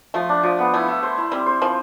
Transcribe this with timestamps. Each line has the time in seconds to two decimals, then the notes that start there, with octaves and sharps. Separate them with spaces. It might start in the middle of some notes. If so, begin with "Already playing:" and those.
0.14 F3 A3
0.29 D4
0.43 F3
0.59 B3
0.74 A3 E4
0.88 E4
1.03 C5
1.18 E4
1.31 G3 C4
1.46 C5
1.62 F3 C5